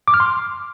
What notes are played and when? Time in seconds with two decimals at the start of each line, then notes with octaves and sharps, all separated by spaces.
0.08 D6
0.14 F6
0.20 C6